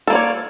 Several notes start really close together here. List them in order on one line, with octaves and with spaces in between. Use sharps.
A4 A#3 D5 C#5